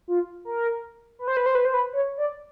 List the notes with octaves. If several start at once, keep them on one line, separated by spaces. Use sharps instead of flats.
F4
A#4
B4
C5
B4
C5
B4
C5
B4
C#5
D5